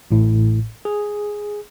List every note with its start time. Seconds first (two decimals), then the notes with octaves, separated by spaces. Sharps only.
0.11 A1 A2
0.85 G#4